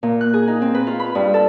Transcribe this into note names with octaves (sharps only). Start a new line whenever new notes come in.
A#2
F#6
G#4
D#4
C4
B4
F4
B5
G2
A4